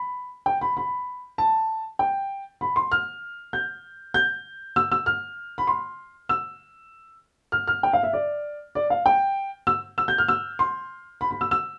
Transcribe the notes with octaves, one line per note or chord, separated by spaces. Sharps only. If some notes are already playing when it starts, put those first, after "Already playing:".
Already playing: B5
G5
B5
B5
A5
G5
B5
C6
F6
G6
G6
E6
E6
F6
B5
C6
E6
F6
F6
G5
F5
E5
D5
D5
F5
G5
E6
E6
G6
F6
E6
C6
B5
B5
E6
E6